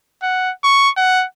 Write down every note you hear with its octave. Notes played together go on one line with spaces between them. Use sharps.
F#5
C#6
F#5